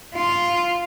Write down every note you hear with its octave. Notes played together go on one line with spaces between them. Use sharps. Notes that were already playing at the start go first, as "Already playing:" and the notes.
F4